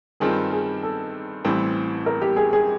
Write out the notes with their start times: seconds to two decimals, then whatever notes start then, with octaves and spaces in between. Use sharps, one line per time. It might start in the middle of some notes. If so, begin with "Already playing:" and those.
0.20 G2 D#3 G3 C4 F4 G#4
0.52 G#4
0.83 A4
1.44 A1 A2 E3 G3 C4
2.06 A#4
2.21 G4
2.37 G#4
2.53 G#4